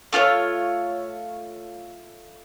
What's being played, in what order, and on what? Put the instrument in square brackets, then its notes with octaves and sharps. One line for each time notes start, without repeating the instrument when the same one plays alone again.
[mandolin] A3 F4 A4 C#5